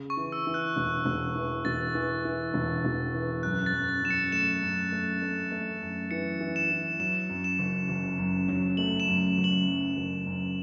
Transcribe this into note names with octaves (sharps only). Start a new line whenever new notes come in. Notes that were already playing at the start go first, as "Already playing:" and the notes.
Already playing: C#3
C#6
E3
E6
E3
F#6
E1
E1
E3
E1 A6
E3
E3
E1
E1
E3
F#2 F#6
A6
F#2
A6
F#2 E7
C#7
A3 E7
F#2
A3
A3
A3
F#2
E3 C#7
E3
E7
E3
F#3 E7
F#2
E7
F#1
F#1
F#2
F#3
A3 F#7
E7
F#2
F#1
F#7
F#2
F#1
F#2